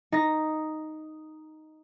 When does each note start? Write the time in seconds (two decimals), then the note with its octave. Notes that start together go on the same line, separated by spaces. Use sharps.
0.12 D#4 A#6